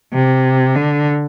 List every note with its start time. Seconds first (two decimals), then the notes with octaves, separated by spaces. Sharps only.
0.14 C3
0.75 D3